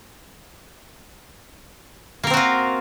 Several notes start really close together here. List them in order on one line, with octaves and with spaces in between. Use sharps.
A#3 A#4 C4 F#4 F4